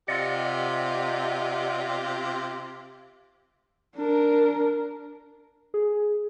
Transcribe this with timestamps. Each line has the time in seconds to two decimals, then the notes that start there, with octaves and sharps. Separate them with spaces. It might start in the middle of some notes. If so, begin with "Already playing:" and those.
0.08 C3 F4 G4 D5 D#5 F#5
3.97 D4 A#4
5.74 G#4